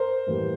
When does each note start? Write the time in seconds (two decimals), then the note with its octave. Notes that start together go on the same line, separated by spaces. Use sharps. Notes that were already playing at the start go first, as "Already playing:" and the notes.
Already playing: A#4 C5
0.27 A2 E3 G3 A#3